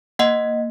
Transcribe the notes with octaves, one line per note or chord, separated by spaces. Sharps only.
A#3 D#5 F#5